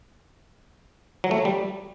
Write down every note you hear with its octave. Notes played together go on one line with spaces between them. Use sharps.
F#3
A3
F#3
G3